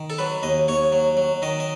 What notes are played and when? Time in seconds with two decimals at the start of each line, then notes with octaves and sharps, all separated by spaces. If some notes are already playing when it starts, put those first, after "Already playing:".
Already playing: D#3
0.10 A4
0.18 F#3 B4
0.43 D#2 D#5
0.68 D#2 C#5
0.92 F#3
1.17 F#3
1.42 D#3 D#5
1.60 D#5